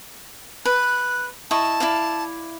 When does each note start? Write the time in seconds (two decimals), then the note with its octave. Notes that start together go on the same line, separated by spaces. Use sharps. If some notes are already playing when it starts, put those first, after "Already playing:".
0.65 B4 F#6
1.51 E4 D#5 A5 C#6
1.80 E4 D5 F5